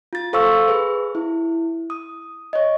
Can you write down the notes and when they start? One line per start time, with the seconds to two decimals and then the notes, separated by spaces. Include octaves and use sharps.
0.13 F4 A6
0.33 A4 C5 F5 C6 C#6 E6
0.68 G#4 B4
1.15 E4
1.90 D#6
2.53 C#5 D#5